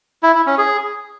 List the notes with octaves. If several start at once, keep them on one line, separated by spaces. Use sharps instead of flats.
E4
E4
C#4
G#4